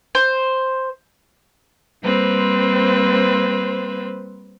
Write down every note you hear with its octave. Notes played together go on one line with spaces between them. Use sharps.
C5
G3 A#3 C4 B4 C5